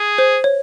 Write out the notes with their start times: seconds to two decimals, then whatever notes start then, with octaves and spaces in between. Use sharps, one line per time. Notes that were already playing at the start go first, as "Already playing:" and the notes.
Already playing: G#4
0.18 C5
0.44 C#5